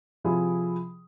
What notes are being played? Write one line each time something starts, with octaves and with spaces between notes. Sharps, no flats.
C3 F3 E4 F4 G4 G#4